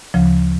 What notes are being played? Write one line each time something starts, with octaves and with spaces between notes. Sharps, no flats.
D2 C#3 F3